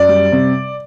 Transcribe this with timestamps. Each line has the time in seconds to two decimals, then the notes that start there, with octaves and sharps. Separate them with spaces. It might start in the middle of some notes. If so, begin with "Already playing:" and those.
Already playing: F#2 D5
0.09 G3
0.32 C3